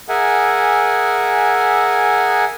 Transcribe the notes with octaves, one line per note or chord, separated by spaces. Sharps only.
G#4 A#4 E5 F#5 G#5